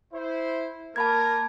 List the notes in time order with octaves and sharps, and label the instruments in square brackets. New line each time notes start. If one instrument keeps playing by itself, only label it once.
[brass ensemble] E4 C5
[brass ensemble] A#3 A#4 [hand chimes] A5 B5 G#6